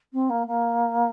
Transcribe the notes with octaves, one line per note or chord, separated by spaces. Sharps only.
C4
A#3
A#3